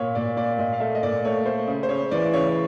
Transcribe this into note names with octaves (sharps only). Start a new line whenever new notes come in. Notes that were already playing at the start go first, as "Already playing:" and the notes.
Already playing: A#2 C#5
A#2 D5
A#2 D5
A#2 D#5
F5
A3 E5
D#5
A#2 D5
A3 C#5
A3 C5
C#3
C5
C#3 C#5
E3 D5
C#3 C#5